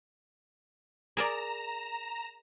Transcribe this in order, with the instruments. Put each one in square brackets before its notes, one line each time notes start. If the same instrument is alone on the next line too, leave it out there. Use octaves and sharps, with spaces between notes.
[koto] G#4 A#4 D5 [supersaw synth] A#5 E7